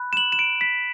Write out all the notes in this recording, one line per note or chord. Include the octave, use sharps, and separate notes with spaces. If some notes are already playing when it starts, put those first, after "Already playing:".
Already playing: B5 F#6
E7
F#7
E7
D7
B6